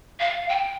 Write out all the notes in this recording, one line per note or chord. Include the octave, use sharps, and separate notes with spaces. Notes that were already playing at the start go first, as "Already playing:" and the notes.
F5
G5